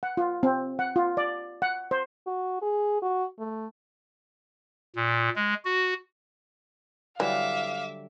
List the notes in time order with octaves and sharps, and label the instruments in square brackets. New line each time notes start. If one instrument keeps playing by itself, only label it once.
[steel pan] F#5
F4
C4
F#5
F4
D5
F#5
C5
[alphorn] F#4
G#4
F#4
A3
[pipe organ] A#2
G#3
F#4
[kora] D3 F#3 G3 [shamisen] E3 [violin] E5 D6 [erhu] F5